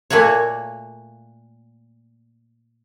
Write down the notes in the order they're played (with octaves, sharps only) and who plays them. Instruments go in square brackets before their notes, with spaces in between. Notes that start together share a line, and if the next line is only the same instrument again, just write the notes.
[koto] A#2 A3 A#3 F#4 C#5